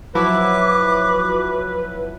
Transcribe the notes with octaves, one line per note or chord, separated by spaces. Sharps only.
F3 F#3 E4 B4 D6